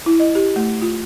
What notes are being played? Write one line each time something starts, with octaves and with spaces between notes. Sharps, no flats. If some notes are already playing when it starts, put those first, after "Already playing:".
E4
D#5
G4
A3
F4